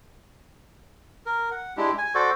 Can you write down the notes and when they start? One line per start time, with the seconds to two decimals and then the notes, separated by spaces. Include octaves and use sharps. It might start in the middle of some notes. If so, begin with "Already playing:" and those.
1.26 A#4
1.51 F#5
1.77 G#3 D4 E4 G4
1.98 G#5
2.15 F#4 A4 C5 D5